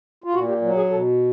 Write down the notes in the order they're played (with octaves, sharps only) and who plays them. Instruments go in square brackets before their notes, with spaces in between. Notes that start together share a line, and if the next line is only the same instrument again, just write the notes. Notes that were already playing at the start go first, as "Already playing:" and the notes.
[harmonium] F4
A#2 F#4
G4
F#3
G#4
B2 A4